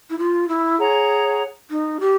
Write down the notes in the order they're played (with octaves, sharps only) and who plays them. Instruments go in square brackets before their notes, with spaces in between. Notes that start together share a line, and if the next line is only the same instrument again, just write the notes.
[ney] E4
F4
E4
[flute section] G#4 C#5 F#5 A#5
[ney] D#4
G4